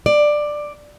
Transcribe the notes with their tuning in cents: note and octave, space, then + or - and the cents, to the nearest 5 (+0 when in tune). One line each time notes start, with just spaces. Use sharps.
D5 +10